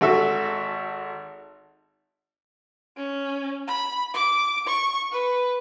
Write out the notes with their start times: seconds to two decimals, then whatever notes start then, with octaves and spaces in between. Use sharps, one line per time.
0.01 G#1 F#4 A4 E5
2.97 C#4
3.68 B5
4.14 D6
4.67 C#6
5.12 B4